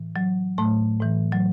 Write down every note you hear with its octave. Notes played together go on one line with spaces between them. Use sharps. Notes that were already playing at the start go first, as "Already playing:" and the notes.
Already playing: A2 E3
F#3
A2 A3
A2 E3
F#3